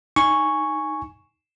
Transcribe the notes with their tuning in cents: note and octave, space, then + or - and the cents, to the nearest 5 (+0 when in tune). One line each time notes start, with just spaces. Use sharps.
D#4 +0 G#5 +0 C#6 +0